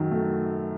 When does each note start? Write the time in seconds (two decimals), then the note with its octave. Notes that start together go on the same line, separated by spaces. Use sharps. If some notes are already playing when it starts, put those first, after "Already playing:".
Already playing: F#2 D#3 F#3
0.11 A3